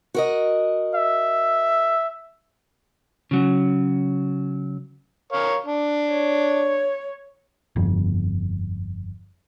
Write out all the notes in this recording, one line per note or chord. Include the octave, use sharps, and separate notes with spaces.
F#4 A#4 D#5
E5
C#3 F#3
A#4 C#5 F5
D4
C#5
G1 F2